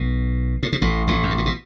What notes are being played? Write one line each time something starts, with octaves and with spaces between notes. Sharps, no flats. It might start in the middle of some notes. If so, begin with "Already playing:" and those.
Already playing: B1 B2
A2
B2
A1 A2
A1 A2
F#2
G2
A2
B2